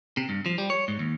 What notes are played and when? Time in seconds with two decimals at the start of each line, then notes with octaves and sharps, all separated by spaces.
0.17 C3
0.29 G2
0.46 F3
0.58 G3
0.70 C#5
0.88 G#2
0.99 D#2